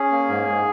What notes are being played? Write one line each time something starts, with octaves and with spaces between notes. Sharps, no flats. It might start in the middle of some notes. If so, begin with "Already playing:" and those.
Already playing: C#4 G#4
A#3
G#2
G#2